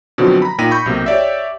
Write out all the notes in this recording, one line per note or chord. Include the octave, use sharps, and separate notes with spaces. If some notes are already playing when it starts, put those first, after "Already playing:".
B2 D3 F3 F#3 C4
A#5 B5
A#2 D#4 G5 A#6 B6 D#7
B5 C#6 G6
B1 C3 A#3
G4 C#5 D5 E5